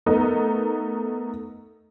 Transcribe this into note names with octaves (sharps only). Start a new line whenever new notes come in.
A3 B3 D#4 A#4